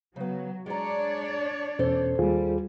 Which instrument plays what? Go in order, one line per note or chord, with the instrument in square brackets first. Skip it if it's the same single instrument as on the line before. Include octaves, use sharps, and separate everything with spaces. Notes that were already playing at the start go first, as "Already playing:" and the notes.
[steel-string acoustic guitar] C#3 B3 [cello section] F#3
[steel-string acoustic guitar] G#3 A#5 [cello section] D4 C#5 D5
[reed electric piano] E2 B2 C#4 [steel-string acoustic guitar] A4 C5
[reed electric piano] D#2 F4 G#4 [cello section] G3